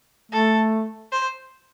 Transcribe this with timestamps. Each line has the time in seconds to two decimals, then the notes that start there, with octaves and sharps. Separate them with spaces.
0.32 A3 A4
1.12 C5